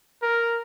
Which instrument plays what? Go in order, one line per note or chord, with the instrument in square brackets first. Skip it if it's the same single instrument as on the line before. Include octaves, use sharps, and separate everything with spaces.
[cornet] A#4